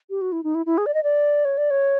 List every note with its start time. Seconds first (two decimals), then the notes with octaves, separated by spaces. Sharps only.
0.10 G4
0.21 F#4
0.32 E4
0.44 D#4
0.55 E4
0.66 E4
0.78 G#4
0.86 D5
0.94 D#5
1.03 D5
1.45 C#5
1.58 D5
1.71 C#5